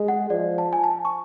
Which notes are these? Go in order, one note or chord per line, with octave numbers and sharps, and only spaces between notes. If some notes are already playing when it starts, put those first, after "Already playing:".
Already playing: G#3
F#5
F3 D5
A5
G#5
A5
C#6